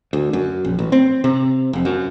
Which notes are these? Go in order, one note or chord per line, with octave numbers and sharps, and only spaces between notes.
D2
F#2
A#1
A1
C4
C3
F1
F#2